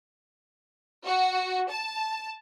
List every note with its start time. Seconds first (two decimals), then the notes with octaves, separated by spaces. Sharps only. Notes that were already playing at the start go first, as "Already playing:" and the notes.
1.04 F#4
1.69 A5